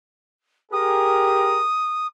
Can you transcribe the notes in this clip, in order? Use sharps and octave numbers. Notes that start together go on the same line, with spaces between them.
G4 G#4 A#4 D#6